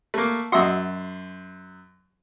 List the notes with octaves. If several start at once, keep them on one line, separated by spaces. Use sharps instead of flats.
A3 A#3
F#2 F#4 D#5 E5 C6